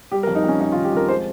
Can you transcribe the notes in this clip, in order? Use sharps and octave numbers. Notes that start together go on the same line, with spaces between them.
G3 G4
A#4
F2
D#4
F2 C#4
F2 D#4
F4
D#3
G4
F2 A#4
G#3 C5